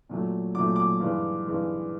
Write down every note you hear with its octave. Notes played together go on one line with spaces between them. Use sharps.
A#2 F#3 A3
A#2 F#3 A3 D6
D6
G2 E3 G#3
G2 E3 G#3